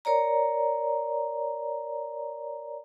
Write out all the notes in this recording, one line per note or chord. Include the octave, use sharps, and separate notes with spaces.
A#4 C#5 D5 A#5